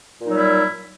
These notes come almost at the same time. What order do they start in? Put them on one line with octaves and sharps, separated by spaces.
A#2 D#4 F#3 G3 E4